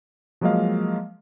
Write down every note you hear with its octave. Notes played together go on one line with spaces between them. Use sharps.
F3 F#3 G#3 A#3 D#5 F5